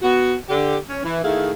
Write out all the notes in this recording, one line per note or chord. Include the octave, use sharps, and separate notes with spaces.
B3 F#4
D3 G4
C#4
E3
D#3 A3 E4 G#4 F5